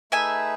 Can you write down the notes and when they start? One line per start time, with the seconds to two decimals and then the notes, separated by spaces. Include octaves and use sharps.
0.12 A3 D#4 G#4 B4 E5 G#5